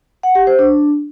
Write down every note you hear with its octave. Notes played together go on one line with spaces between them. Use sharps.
F#5
G4
C5
D4